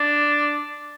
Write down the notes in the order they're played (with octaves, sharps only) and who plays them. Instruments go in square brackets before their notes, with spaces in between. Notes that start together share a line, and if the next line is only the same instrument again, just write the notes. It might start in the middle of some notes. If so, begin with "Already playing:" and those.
Already playing: [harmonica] D4